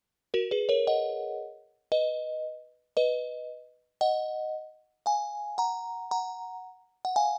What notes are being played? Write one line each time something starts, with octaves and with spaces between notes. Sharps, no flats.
F#4 A#4
G#4 B4
A#4 C#5
D#5 F#5
B4 D#5
B4 D#5
D#5 F#5
F5 G#5
F#5 A#5
F#5 A#5
F#5
F5 G#5